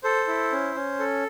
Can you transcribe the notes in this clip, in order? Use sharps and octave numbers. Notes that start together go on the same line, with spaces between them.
A4 C5
E4
C#4
C#4
A4